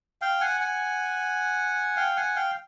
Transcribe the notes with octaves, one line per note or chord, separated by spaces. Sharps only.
F5 G5
F#5 G#5
F#5 G#5
F5 G5
F#5 G#5
F5 G5